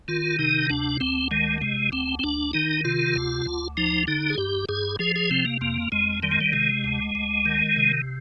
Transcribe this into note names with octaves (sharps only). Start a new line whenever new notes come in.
D#3 F4
C3 D#4
D2 D4
D2 C4
D#3 G#3
C3 G#3
D2 C4
C4
D2 D4
D#3 D#4
C3 F4
D2
D2
F3 D#4
D3 D#4
G#4
G2 G4
G2 G#4
F3 G#4
G#4
C3 C4
A#3
F2 A#3
F2 G#3
D#3 G3
G#3
G3
C3 G#3
D2
D2
D#3
C3